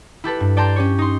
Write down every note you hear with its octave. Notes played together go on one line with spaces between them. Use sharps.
E4 G4 A4 B4
G2
D5 G5 A5 A#5 C6 G6
C#4 G4 C#5
D#4 C6